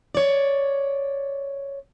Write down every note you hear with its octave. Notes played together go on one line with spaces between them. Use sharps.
C#5 D5